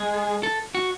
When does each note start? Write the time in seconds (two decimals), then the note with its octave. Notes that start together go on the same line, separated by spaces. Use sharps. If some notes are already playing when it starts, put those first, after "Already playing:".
Already playing: G#3 G#4
0.43 A4
0.75 F#4